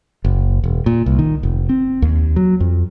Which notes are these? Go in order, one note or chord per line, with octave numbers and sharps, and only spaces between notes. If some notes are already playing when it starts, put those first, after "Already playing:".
F#1
E1
A#2
C2
D#3
F1
C4
D#2
F#3
F2